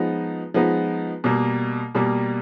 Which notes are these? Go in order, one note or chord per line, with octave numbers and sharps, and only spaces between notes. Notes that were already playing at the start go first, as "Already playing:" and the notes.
Already playing: F3 G#3 B3 D#4
F3 G#3 B3 D#4
B2 G3 A#3
B2 G3 A#3